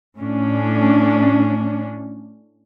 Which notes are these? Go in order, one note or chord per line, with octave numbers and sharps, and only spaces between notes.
A2 C#4 D4